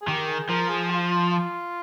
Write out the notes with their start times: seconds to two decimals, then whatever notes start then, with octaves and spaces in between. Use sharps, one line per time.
0.02 G#4
0.08 D#3 G4
0.28 G#4
0.49 F3 A#4
0.69 G#4
0.90 F4
1.32 F4